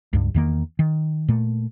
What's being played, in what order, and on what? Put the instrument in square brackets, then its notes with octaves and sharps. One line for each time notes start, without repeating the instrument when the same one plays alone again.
[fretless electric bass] C#2 G2
E2 D#3 A#3
D#3
A#2 A3